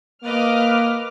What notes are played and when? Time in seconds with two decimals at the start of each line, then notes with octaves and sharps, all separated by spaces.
0.24 A#3 B4 D#5 D6 F6